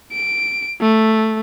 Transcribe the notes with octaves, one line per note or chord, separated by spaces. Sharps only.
D7
A3